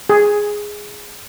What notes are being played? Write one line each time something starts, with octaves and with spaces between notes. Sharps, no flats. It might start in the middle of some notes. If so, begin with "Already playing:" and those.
G#4